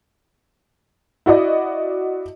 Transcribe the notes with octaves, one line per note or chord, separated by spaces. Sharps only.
E4 F#4 D5 D#5